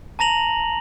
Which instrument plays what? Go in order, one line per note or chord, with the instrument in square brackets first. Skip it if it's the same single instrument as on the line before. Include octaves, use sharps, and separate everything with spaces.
[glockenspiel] A5 A#5 A#6 F7 F#7